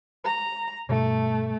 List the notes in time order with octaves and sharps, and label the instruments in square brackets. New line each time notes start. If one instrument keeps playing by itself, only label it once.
[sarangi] A#5
[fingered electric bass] G2 B2 G3 [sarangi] A3